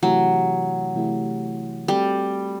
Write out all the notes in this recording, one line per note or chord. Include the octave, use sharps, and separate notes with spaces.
C3 E3 F#3 A3 E4 G4
C3 E3 A3 E4 G4
G3 A3 C4 F#4 A4